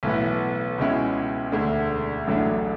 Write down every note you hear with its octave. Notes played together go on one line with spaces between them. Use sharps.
B1 A2 E3 B3
C#2 B2 G#3 C#4 E4
E1 D2 D3 A3 D4
A1 A2 F#3 A3 D4